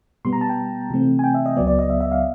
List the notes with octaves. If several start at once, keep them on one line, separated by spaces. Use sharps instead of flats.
B2 G3 B3 C6
A#5
A5
G5
C3 E3 A3 C4
G#5
G5
E5
D#5
C#2 C#3 F#3 B3 D5
D5
D#5
E5
E5
F5